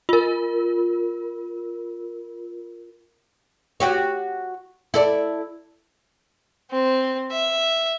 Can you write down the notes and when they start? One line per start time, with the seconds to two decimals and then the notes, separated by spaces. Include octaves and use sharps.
0.09 F4 A#4
3.80 F#4 G4 C#5
4.94 E4 A4 D5
6.71 C4
7.31 E5